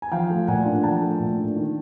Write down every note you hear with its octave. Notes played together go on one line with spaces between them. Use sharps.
G#5
F3 F5 G5
A3
A#2 F#5 G#5
D4
F3 G5 A5
A3
A#2
D4
D#3